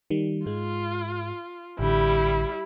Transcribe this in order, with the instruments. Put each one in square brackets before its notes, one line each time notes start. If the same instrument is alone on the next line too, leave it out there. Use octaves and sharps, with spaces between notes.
[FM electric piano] D#3 G3
[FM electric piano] G#2 G#3 [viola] F4
[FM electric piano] A1 D3 [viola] G3 E4